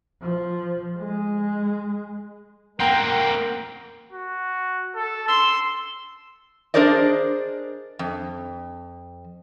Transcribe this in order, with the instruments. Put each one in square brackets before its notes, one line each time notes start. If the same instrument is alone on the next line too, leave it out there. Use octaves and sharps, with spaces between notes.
[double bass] F3
G#3
[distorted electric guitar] A#3 C4 [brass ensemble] A#4 [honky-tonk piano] F#5 G5 A#5
[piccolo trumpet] F#4
A4
[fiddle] C6 [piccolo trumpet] E6
[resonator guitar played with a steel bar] D4 G#4 A#4 C5 D5 D#5
F2